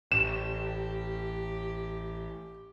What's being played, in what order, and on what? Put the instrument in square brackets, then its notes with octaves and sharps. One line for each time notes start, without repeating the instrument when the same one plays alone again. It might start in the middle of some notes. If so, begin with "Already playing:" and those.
[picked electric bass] A1 [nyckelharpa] G4 [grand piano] E7